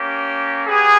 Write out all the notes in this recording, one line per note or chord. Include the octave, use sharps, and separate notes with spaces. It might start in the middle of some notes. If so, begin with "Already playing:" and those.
Already playing: A#3 C#4 G4
B3 G4 G#4